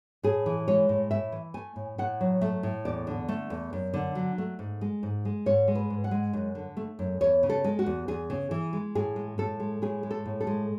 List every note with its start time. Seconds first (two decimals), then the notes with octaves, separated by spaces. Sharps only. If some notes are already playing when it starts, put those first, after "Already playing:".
0.23 A2 G#4
0.46 E3
0.68 G#3 C#5
0.89 A2
1.11 A2 E5
1.32 E3
1.54 A3 G#5
1.76 A2
1.98 A2 F#5
2.21 F#3
2.41 A3 E5
2.63 A2
2.85 E2 D5
3.07 D3
3.28 A3
3.50 E2
3.73 F#2
3.94 D3
4.15 F#3
4.38 A3
4.59 G#2
4.81 G#3
5.03 G#2
5.25 G#3
5.46 G#2 C#5
5.68 G#3
5.75 B4
5.90 G#2
6.04 F#5
6.11 G#3
6.33 F#2
6.55 D3
6.77 A3
6.99 F#2
7.21 E2 C#5
7.43 C#3
7.50 A4
7.64 G#3
7.79 F#4
7.86 E2
8.08 E2 G#4
8.30 C#3
8.51 E3
8.73 G#3
8.95 A2 G#4
9.16 G#3
9.38 A2 A4
9.60 G#3
9.82 A2 G#4
10.03 G#3
10.11 A4
10.26 A2
10.41 A4
10.47 G#3